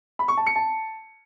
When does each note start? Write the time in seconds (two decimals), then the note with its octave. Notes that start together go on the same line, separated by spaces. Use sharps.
0.19 B5
0.28 C#6
0.37 A5
0.46 C#7
0.56 A5